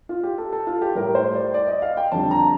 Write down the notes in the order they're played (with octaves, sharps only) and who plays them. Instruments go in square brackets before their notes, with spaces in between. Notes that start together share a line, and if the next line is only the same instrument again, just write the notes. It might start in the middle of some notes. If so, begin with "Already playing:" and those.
[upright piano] F4
G4
A4
A4
F4
G4
A2 G3 A#4
C5
D5
D5
D#5
F5
G5
F2 D3 G3 A5
A#5